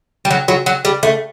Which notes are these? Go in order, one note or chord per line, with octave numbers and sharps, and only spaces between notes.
G3
F#3
F#3
F#3
G3
A3